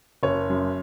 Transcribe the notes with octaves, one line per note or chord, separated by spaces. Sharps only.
F#1 C#5
F#2